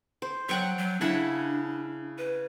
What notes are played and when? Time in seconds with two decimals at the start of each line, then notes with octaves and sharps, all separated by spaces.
0.22 C5
0.49 F#3 F#5 G5 C#6
0.78 F#3
1.01 C#3 D4 E4 F#5
2.18 B4